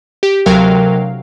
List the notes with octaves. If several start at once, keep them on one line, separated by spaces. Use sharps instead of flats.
G4
D2 C3 F#3 A#4 F5 G5